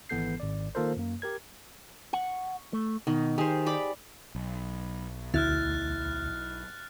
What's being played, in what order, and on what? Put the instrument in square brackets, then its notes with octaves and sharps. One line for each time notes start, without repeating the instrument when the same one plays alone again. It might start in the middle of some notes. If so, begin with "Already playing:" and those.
[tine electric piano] G#1 E3 B3 A4 G6 C7
G#1 D5
D#3 A#3 F4 A4 A#4 C5
F#2 A#3
G4 A#4 G#6
[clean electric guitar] F#5 [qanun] C#6
[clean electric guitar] A3
[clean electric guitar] B2 [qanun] D#3
[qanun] D#3 C5 [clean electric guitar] G4 G#4
[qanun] D5 B5 D6
[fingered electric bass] B1
[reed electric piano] D2 [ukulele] E4 [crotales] F6 F#6 A6